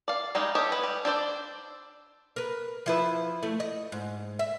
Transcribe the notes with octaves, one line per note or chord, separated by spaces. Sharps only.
D5 F5
G3 G#3 D#4
G4 A4 C#5 D#5
B4
G3
D4 A4 C5 D5
A#4 B4
F3 E4 B4
A3
D#5
G#2
E5